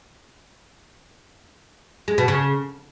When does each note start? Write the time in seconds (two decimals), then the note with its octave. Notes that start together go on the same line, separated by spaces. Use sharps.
2.08 G#3
2.18 B2
2.28 C#3